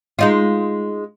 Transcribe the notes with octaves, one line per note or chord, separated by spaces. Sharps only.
G#3 D#4 F4